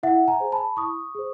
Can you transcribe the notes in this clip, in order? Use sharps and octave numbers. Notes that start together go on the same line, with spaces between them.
E4 E5 F#5
G#5 A#5
G#4 C5
A5 B5
E4 C#6 D#6
G#4 C5